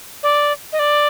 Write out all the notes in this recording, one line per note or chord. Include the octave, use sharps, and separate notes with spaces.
D5
D#5
D5